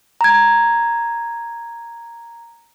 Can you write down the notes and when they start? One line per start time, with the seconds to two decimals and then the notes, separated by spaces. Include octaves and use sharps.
0.21 A#5 G#6